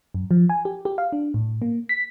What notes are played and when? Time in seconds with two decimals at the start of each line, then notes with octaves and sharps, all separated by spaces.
0.14 F#2
0.31 F3
0.49 G#5
0.65 G4
0.85 G4
0.98 F5
1.13 D4
1.34 A2
1.62 A#3
1.89 B6